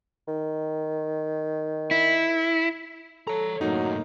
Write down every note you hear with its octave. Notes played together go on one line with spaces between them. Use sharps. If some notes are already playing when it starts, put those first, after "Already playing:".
D#3
E4
A4 C#5 A#5
F#2 A2 F#3 A#3 D#4